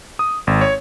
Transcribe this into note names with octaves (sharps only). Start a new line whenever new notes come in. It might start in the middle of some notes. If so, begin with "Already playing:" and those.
D#6
G#1
C#5